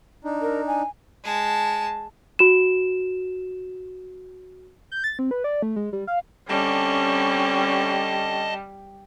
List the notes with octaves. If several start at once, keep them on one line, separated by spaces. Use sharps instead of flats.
D4 D#4
A#4
G#5
G#3 A5
F#4 E7
G6
A6
C4
B4
D5
A3
G#3
G3
F5
D3 G3 C4 C#4 D#5 A5